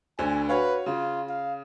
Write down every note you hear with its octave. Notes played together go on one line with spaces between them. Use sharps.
D2 D3 C5 G#5
F#4 B4 C#5 F5
C#3 F4
F5